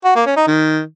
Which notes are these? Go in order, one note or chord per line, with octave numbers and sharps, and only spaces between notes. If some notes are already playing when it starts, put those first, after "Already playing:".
F#4
A#3
C#4
D#4
D#3